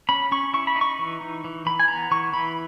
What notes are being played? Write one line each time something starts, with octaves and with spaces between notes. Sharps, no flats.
C#4 B5
C#4 C#6
E4 C#6
B5
D#4
C#6
E3
D#4
E3
E3 B5
G#5
B3 A#5
E3 C#6
E3 B5